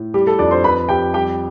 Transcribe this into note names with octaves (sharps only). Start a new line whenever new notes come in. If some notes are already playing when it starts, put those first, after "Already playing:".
Already playing: A2
G3 G4
A4
F2 D4 D5
C5 C6
F2 B4 B5
F2 G4 G5
G3 G4 G5